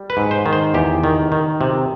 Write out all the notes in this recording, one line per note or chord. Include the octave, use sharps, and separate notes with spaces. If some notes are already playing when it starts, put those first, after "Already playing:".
Already playing: G3
B4
G#2
C5
D#3
C5
E2 G4
D#3
D#3
C3